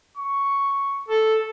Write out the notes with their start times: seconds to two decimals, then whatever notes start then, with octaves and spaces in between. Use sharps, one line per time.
0.17 C#6
1.09 A4